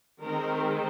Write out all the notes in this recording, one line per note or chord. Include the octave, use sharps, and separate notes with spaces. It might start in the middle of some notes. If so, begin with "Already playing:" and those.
D#3 G#3 C4 A#4